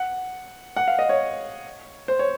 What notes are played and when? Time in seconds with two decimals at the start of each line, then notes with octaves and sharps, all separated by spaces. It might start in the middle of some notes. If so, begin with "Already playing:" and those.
Already playing: F#5
0.76 F#5
0.88 F5
0.99 D#5
1.09 C#5
2.08 C5
2.19 C#5